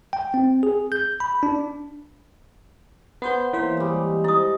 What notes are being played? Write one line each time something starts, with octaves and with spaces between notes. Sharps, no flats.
G5
C4
G#4
G6
B5
D4
B3 C5 F#5 G6
E3 A#3 C5 C#5 F5
G3 G#3
E4 D#5 D#6